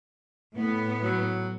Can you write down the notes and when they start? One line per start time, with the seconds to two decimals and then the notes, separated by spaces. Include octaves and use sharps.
0.56 A2 B3
1.04 F#3